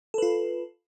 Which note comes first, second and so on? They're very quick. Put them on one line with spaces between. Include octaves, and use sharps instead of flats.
A4 B4 F4